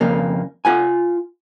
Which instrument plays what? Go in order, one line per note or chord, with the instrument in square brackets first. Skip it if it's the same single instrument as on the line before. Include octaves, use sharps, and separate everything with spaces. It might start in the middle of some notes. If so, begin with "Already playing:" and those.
[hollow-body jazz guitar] F2 C#3 A#3
F4 F#5 G#5